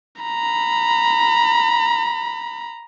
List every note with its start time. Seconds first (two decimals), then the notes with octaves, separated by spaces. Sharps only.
0.21 A#5 B5